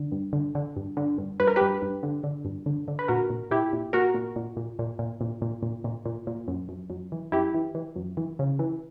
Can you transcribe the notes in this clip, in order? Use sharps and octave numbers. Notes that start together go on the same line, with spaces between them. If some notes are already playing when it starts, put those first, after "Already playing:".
Already playing: D3
G2
D3
D3
G2
D3
G2
G2 B4
A#4
G2 G4 B4
G2
D3
D3
G2
D3
D3
B4
A#2 F#4 A#4
A#2
A#2 E4 G4
A#2
A#2 F#4 A#4
A#2
A#2
A#2
A#2
A#2
A#2
A#2
A#2
A#2
A#2
A#2
F#2
F#2
F#2
E3
F#2 E4 G4
E3
E3
F#2
E3
C#3
E3